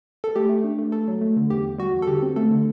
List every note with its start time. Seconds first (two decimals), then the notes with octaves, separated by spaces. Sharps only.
0.24 A4
0.36 A3 G4
0.49 A3
0.64 D4
0.79 A3
0.92 A3 A4
1.08 F#3
1.21 A3
1.36 D3
1.50 E2 G4
1.65 E2
1.78 G3 F#4
1.93 E2
2.02 A4
2.07 D3 G4
2.22 C4
2.36 A3 A4
2.50 D3